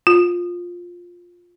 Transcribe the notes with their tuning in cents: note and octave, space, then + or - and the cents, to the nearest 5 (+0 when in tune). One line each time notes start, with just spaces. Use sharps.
F4 +10